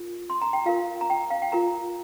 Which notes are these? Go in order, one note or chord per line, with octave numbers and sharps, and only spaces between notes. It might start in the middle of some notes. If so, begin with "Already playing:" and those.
Already playing: F4 A#4
C6
A#5
G5
F4 A#4 F5
A#5
G5
F5
G5
F4 A#4 A#5